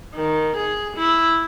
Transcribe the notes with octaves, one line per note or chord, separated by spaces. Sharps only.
D#3
G#4
E4